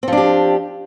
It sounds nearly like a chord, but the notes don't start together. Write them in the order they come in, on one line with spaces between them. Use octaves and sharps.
C4 F3 D4 G4